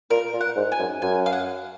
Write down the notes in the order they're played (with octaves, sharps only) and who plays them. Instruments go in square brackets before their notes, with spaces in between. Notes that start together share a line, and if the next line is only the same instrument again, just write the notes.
[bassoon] A#2 [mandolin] A#4
[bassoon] A#2
[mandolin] F#5
[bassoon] G#2
[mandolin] G#5
[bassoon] F#2
[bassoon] F#2 [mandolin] G#5
[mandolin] F5
F#5